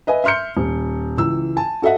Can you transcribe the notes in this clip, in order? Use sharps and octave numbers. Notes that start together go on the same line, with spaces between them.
B4 D#5 E5 G#5
E5 C6 F6 G6 C#7
D#1
C#2 E3 E6
G#5 A5
F#4 A4 D#5 E5 F#5